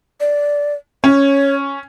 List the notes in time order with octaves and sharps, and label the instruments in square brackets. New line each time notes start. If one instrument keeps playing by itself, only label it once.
[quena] D5
[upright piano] C#4 [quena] C#5